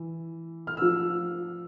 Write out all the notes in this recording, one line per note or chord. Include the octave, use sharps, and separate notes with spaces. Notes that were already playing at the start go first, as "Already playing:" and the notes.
Already playing: E3
F6
F3 E6